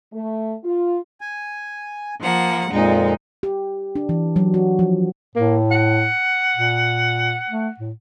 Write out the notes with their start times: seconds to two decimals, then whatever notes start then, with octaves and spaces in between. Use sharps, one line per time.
0.12 A3
0.64 F4
1.21 G#5
2.22 F3 A#3 F#5
2.71 F2 A#2 G#3 D#4
3.43 G4
3.95 D4
4.09 E3
4.36 F#3
4.54 F#4
4.79 F3
5.36 A2 A#3
5.71 F#5
6.56 A#2
7.49 A3
7.80 A2